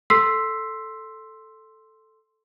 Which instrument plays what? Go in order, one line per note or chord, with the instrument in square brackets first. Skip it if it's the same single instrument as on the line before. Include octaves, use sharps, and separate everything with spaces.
[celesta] A4 C6 E6 B6 C7